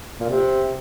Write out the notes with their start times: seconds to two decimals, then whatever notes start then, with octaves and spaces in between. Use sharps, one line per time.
0.20 A#2
0.29 C3